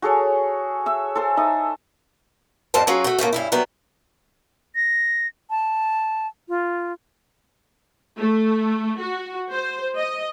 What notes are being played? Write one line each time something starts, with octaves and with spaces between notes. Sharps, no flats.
F#4 G#4 A4 C#5
E5 E6
A4 C5 G#5
D#4 E5 D#6
F2 A2 G3 C5 A5
F#3 C#4 F4 F#4 G#4
A3 F#4
A2 C#3 A3 A#3
G2 C#4 E4
F#3 G3 B3
A#6
A5
F4
A3
F#4
C5
D#5